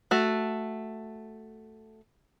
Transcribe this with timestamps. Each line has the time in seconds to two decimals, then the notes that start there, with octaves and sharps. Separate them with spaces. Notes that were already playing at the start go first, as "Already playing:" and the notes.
0.11 A3 F#4